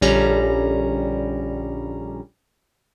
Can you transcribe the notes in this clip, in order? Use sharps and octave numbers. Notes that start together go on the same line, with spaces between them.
A#1 D3 G3 C#4 A#5